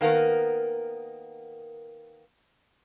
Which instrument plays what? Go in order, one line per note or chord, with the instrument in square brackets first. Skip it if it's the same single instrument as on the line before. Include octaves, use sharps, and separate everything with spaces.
[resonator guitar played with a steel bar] D#3 A#3 B3 A#4